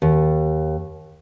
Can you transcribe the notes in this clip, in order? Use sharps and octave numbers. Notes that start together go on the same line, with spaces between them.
D#2